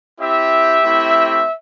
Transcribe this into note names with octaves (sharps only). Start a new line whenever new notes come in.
C4 E4 G4 E5
A3 C4 E4 G4